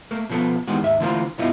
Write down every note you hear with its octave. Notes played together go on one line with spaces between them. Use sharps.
A3 A#3
B2 F3 B3 A4
D#3 E3 G3 G#3 B3 F#4
D#2 G#2 E5
D3 E3 A3 A#3 F4 C5
C2 G2 B3 E4 F4 D#5